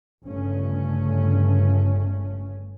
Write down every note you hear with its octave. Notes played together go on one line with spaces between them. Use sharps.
G1 G2 C#3 A3 C#4